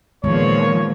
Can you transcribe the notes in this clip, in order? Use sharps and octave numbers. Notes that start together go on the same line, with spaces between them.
A#2 D#3 F3 G#3 B3 C#5